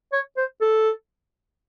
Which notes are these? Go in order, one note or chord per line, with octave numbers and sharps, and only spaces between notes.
C#5
C5
A4